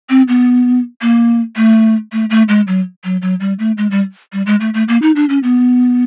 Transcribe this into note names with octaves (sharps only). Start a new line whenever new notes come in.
C4
B3
A#3
A3
A3
A3
G#3
F#3
F#3
F#3
G3
A3
G#3
G3
G3
G#3
A3
A3
A#3
D#4
D4
C#4
B3